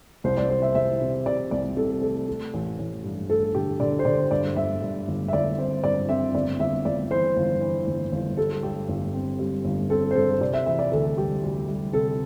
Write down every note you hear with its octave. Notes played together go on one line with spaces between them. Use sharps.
C2 C5
D5
C4 C5
E5
C2 E5
C3
C3 D5
C2 D5
C3 A4
A3 A4
A3
A1
A1
G2
A3 A4
D3 G4
D3 D5
C5
D3 D5
G2 D5
G1 E5
G2
G1
E5
G1 D5
C4 C5
G2 D5
C4 E5
G1 D5
G1 E5
G1 D5
E3 C5
G1
E3
G1
G1
G3 A4
G2 G4
G1
C4
G3
G1
C4 A4
C5
G2 A4
C3 D5
E5
E3 E5
D5
D2 A4
G3 G4
D2
G3
C3 A4